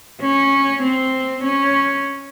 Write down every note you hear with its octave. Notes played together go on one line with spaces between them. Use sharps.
C#4
C4
C#4